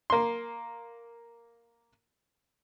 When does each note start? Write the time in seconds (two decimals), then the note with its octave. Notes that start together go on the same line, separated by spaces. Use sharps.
0.10 A#3 C6